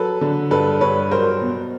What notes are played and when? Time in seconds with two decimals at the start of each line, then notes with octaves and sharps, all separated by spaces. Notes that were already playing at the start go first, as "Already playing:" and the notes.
Already playing: F#3 A4 B4
0.21 D3
0.51 G2 A4 B4
0.80 G2 B4 C#5
1.11 F#3 A#4 C5
1.41 B2